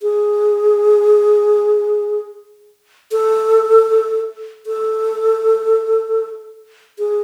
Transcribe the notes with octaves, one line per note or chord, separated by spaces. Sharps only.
G#4
A4
A4
G#4